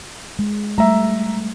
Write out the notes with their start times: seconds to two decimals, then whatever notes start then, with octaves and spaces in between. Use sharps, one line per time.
0.39 G#3
0.78 G3 A3 E5 A#5